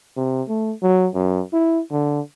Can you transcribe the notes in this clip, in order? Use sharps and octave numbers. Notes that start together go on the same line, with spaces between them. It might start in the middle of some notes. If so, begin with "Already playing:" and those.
C3
A3
F#3
F#2
E4
D3